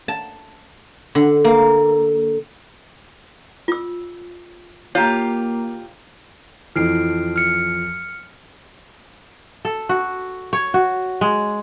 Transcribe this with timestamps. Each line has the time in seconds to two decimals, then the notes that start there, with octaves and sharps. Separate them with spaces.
0.08 A5
1.15 D3
1.45 A#3
3.68 F4 E6
4.95 A#3 F4 G4 C#5 A#5
6.76 F2 E3 F3 F6 C7 D7
7.36 F6 C#7
9.65 A4
9.89 F#4
10.53 C#5
10.74 F#4
11.21 G#3